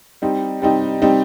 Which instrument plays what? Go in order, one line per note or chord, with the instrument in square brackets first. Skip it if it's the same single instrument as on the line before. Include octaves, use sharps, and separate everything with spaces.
[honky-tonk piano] G3 C4 D#4
G3 C4 D#4
G3 C4 D#4